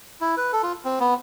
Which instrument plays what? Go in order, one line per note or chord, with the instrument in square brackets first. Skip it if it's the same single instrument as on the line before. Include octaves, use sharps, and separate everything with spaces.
[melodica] E4
B4
A4
F4
C4
B3